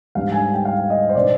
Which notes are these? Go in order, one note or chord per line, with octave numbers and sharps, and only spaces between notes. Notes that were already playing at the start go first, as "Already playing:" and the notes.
G#2 G3 B3 D4 F5
G#5
G5
F5
D#5
C5
B2 B3 D4 D5